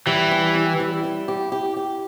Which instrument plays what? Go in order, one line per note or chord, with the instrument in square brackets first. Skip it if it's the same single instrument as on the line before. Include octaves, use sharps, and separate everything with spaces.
[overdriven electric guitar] E3 [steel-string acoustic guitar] G3
[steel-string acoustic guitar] G4
E4
G3
E4
G4
G4
G4